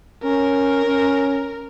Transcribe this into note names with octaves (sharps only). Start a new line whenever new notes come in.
C#4 A#4
C#4